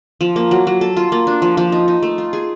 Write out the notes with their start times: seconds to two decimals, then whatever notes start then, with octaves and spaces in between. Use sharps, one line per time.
0.21 F3
0.36 A#3
0.51 F#3
0.67 F#3
0.81 A4
0.97 F4
1.12 A#3
1.27 D4
1.42 F3
1.57 F3
1.72 D#4
1.88 D#4
2.03 A3
2.18 F4
2.33 G#4